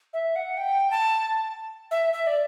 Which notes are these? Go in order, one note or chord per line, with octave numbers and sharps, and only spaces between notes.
E5
F#5
G5
A5
E5
E5
D5